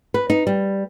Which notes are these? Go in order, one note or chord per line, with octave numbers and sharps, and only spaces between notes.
B4
D#4
G3